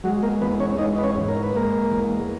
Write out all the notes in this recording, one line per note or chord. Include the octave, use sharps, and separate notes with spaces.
F#3 G#3 F#4
A#3 A#4
E2 B3 B4
C#4 C#5
G#3 D#4 D#5
B4
C#4 C#5
G#2
A#4
B4
G#3 A#3 A#4
E2